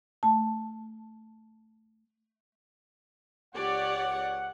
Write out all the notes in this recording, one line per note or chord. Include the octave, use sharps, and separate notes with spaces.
A3 A5
C#2 G4 C#5 D5 F#5